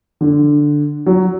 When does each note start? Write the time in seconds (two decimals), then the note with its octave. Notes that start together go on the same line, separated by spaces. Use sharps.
0.21 D3
1.06 F#3